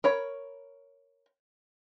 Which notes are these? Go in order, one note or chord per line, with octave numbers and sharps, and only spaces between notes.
A#4 C#5 B5